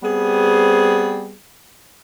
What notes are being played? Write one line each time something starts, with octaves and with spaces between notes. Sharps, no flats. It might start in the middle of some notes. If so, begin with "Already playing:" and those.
G3 B3 C4 G#4